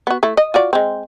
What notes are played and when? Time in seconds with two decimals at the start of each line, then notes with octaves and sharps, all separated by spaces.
0.07 B3 F#4
0.23 A3 E4
0.37 D#5
0.54 F4 F#4 D5
0.73 G#3 C4